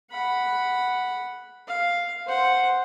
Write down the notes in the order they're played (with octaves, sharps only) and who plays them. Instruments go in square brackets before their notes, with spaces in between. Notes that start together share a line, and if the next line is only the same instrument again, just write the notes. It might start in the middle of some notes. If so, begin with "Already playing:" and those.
[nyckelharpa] F#5 B5
F5
C5 F#5